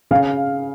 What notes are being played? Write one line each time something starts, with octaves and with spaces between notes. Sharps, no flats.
C#3 F5